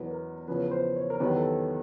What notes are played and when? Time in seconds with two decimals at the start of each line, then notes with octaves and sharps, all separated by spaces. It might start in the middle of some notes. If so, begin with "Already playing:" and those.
Already playing: E2 B2 F#3 B4
0.11 A#4
0.48 E2 C#3 F3 B4
0.64 B4
0.71 C5
0.96 C#5
1.10 A#4
1.20 E2 C3 D#3 F#3 B4
1.37 A4